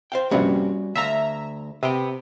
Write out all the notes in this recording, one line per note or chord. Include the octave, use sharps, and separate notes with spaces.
C5 F5 G5
A#1 G2 C3 G3 C#4 F#4
D2 E5 F5 A#5
C3 B3 G5